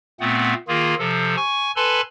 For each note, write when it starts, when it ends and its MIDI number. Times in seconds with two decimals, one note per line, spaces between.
0.20 0.54 46
0.20 0.54 57
0.20 0.54 59
0.20 0.54 60
0.20 0.54 78
0.68 0.95 51
0.68 0.95 58
0.68 0.95 65
0.68 0.95 68
0.99 1.36 48
0.99 1.36 53
0.99 1.36 69
1.37 1.72 80
1.37 1.72 85
1.76 2.01 69
1.76 2.01 71
1.76 2.01 80
1.76 2.01 81
1.76 2.01 83
1.76 2.01 84